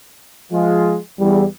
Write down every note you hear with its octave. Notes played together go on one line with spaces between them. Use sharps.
F3 G#3 F4
E2 G3